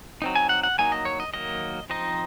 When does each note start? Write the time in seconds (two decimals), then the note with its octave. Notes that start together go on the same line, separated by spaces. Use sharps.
0.22 F#3 C4 D#4
0.35 G#5
0.49 F#5
0.63 F#5
0.78 F#3 A#3 D#4 G#5
0.92 D#5
1.05 C#5
1.20 D#5
1.33 D#3 F#3 A#3 D#5
1.90 F3 C4 D#4 D#5